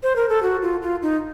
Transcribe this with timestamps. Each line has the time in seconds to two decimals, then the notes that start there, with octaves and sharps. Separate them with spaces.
0.03 C5
0.16 A#4
0.29 A4
0.43 F#4
0.62 F4
0.82 F4
1.02 D#4